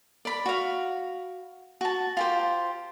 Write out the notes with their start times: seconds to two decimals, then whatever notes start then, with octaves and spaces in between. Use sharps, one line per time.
0.25 D5 B5
0.46 F#4 F5
1.81 F#4 A5
2.17 F4 G4 C5